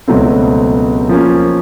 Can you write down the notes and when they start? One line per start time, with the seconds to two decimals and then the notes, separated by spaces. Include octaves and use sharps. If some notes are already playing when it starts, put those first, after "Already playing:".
0.08 C#2 B2 F#3 A3 C4
1.09 F3 A#3 C#4